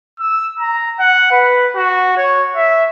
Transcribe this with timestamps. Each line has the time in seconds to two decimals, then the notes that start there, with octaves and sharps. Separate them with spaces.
0.19 E6
0.59 A#5
1.00 F#5
1.31 B4
1.75 F#4
2.17 C#5
2.56 E5